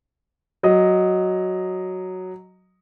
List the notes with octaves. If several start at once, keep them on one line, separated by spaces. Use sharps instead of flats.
F#3 D#5